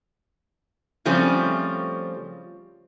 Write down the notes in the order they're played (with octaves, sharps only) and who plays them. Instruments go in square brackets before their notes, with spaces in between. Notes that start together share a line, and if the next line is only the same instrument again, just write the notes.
[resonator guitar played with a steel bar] C#3 F3 G3 A3 C4 C#4